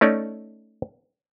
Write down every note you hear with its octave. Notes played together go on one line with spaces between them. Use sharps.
A3 C#4 D#4 C#5 D5